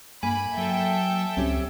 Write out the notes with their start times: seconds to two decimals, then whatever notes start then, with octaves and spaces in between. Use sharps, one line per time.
0.23 G2 A#3 G#5 B5
0.57 F#3 A4 E5 G5
1.37 C#2 C4 C#4 G4